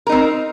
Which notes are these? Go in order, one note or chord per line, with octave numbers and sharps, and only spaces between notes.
C4 D#4 A#4